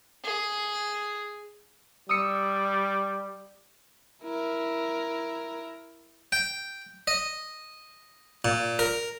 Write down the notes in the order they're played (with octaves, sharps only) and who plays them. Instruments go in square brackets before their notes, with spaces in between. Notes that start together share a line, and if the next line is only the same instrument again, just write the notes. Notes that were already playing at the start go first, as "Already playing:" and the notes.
[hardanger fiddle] G#4
[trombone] G3 [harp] D#6 E6 C#7
[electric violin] E4 A#4
[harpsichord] G5
D#5
A#2
A#4